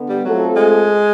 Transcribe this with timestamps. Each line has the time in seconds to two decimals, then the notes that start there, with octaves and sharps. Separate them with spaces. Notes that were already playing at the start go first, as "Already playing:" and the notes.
Already playing: D3 B3
0.09 G3
0.24 F#3 A3 C4 F4 A4
0.56 G#3